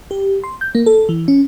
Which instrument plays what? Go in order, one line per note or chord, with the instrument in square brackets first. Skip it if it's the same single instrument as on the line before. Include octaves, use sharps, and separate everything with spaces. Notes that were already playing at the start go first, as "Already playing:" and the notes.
[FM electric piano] G4
C6
G6
A#3
A4
E3
C#4